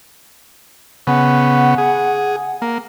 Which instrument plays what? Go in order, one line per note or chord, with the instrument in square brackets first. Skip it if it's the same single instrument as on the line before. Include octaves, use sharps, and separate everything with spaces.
[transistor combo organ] C#3 B3 [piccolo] F#5
[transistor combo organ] G#4
A#3